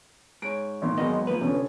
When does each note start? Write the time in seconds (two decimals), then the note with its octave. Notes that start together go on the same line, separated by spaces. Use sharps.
0.42 G#2 C#5 D7
0.82 G#1 A#2
0.97 G#1 D#3 F#3 G#3 B3 D#5
1.27 F3 A#3 B4
1.41 F1 D3 C#4